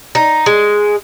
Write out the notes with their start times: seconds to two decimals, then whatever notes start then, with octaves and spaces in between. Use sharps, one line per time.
0.15 D#4
0.46 G#3